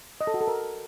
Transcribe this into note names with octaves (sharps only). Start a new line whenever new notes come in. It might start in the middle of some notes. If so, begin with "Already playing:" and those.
D#5
A4
F#4
A4
A#4